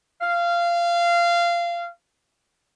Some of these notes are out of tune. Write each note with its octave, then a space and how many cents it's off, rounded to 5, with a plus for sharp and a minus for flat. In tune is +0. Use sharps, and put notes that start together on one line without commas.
F5 -20